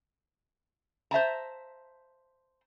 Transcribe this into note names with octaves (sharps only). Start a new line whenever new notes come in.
C5 E5 A5 A#5